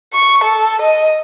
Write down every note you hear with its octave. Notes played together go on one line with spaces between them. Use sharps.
C#6
A4
D#5